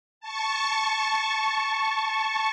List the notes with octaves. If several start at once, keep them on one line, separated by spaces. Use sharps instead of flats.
A5 C#6